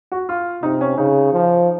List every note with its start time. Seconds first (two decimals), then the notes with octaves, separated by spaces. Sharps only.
0.12 F#4
0.29 F4
0.63 C3 D#4
0.81 C#4
0.97 C#3 D#4
1.33 F3